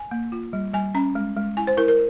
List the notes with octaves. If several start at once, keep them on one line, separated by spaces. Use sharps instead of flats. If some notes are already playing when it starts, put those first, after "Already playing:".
Already playing: G#5
A#3
F4
G3
G3 G#5
C#4 A#5
G#3
G#3
E4 G#5
C5
E4 A#4
A#4